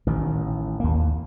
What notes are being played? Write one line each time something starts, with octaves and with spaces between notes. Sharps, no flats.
A1 D#3
D#2 A#3